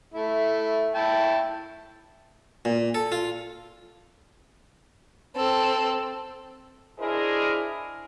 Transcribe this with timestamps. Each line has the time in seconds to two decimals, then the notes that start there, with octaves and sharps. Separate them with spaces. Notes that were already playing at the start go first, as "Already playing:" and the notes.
0.14 A3 E4
0.95 E4 G5 A5
2.65 A#2
2.95 A4
3.12 F4
5.36 C4 A4
7.00 D4 E4 G#4 A#4 C5 D#5